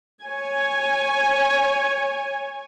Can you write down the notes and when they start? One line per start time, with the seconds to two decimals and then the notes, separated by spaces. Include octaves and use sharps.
0.24 C#5 G#5